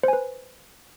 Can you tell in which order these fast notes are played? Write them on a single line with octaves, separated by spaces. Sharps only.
C5 G#5 B4